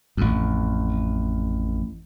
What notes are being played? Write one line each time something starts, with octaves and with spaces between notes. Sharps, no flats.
A1 F2